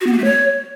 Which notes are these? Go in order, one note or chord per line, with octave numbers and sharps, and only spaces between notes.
F#4
B3
A#3
A3
C#5